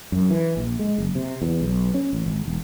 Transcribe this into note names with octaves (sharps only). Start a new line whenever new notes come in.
F#2
E3
A#1
G#3
F#1
C3
E2
B1
C#4
A1
G#1
E1